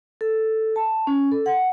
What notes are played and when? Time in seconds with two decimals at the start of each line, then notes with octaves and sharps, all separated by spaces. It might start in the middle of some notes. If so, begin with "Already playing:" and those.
0.21 A4
0.76 A5
1.07 C#4
1.31 A4
1.46 F#5